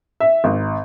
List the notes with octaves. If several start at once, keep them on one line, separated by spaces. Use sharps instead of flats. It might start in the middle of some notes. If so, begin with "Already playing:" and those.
E5
G#1